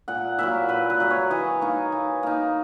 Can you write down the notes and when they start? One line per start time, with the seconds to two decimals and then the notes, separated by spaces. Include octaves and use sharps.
0.08 A#2 F#5
0.39 F#3 A#3 E4 E5
0.69 A#2 B4
0.90 B4
1.00 F#3 A#3 E4
1.10 C#5
1.30 E3 D#5
1.61 A#3 D#4
1.92 E3
2.23 A#3 D#4